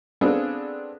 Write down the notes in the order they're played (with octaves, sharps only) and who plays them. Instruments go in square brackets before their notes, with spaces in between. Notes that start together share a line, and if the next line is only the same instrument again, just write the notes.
[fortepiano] B3 C4 D4 F4 G#4 A4